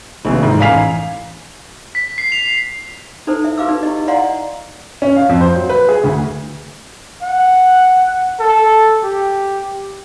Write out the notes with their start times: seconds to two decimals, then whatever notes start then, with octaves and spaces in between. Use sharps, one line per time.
0.25 A#1 D#2 C3 E3
0.43 G#2
0.60 A1 F5 G#5 B6 F7
1.95 B6
2.18 C7
2.32 F7
3.27 D#4 E4 A4 B4 C5
3.44 E5
3.58 F#4 B4 F5 D6 E6
3.69 D#4 B4
3.83 E4 G4 D#5
4.07 D5 D#5 F5 F#5 A#5 C6
5.02 C#4
5.16 F5
5.29 F2
5.41 C5
5.56 F#3
5.69 B4
5.89 G#4
6.04 D2
7.22 F#5
8.40 A4
9.03 G4